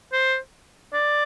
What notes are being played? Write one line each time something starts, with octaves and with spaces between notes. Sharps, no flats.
C5
D5